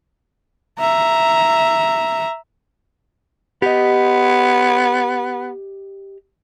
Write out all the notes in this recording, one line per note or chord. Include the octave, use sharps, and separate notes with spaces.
E5 A#5
B3 G4 D#5